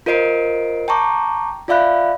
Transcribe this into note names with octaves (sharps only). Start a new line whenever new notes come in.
F4 A#4 C5 D#5 C7 D7
G5 A5 A#5 C#6 D6
F4 D5 E5 F5 B5 F#6